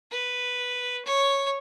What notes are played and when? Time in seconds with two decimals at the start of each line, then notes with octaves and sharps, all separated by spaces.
0.11 B4
1.05 C#5